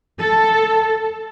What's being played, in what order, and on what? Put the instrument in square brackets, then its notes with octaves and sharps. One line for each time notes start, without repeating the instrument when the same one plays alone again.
[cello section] A4